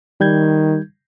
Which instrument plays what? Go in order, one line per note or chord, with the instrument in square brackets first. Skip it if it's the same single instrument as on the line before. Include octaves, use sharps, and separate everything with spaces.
[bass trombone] D#3 [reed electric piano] G3 G6 G#6